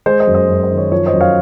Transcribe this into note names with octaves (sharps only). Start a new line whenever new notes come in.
G#3 C5
C5 D#5
F#2
C5 D#5
F#2
C5
D#3
C#5
F3 C#5
C5 D#5
F#2
C#5 F5